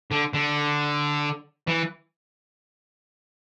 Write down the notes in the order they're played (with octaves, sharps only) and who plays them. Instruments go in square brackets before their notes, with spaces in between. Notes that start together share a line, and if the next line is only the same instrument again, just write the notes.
[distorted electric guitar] D3
D3
E3